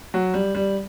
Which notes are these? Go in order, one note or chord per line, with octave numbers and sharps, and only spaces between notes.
F#3
G3
G3